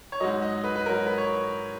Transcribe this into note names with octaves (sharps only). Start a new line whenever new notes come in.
C#5
G#2 F#3 D#5
D#5
B4
B4
G#2 F#3 A#4
B4
C#5